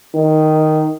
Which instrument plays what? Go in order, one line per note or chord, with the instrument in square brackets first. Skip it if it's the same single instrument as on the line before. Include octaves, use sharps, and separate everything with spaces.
[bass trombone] D#3